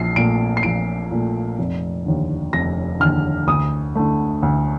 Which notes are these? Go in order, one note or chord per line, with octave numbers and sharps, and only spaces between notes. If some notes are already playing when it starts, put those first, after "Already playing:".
Already playing: A#1 C7
A#2 A3 D7
C7
A#1 D7
A#2 A3
F1
D#2 D3
F1 A#6
D#2 D3 F6
D2 D#6
D3 A3
D2